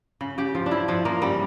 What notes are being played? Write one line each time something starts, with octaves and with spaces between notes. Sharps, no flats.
C#3
C#3 G4
F3 F4
D4
F3 E4
F3 D4
F3 A#3
C#3 G3